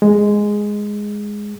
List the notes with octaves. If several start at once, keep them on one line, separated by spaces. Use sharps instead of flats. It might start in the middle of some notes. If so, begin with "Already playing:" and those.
G#3